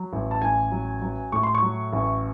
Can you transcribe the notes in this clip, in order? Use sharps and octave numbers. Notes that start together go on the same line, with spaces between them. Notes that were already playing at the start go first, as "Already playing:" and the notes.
Already playing: F#3
A1
A5
A1 G#5
F#3
F#3
A2 C#6
C6
C#6
F#3
A1